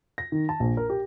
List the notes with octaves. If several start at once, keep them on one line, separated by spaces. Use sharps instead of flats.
A#6
D#3
A5
A#1
A#4
G4